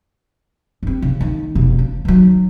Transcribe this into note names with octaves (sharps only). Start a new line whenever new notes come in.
G2 C4
C#3
D#3 A#3
F1 B2
C#3
D#3 F#3